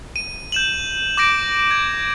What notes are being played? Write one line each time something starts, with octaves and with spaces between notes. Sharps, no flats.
D#7
G6 E7 F#7
D6 G6 A#6 D7
G#6